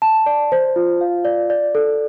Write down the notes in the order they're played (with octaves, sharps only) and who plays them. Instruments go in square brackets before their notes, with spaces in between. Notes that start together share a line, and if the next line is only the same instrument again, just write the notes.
[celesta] A5
D5
C5
F4
F5
D5
D5
A4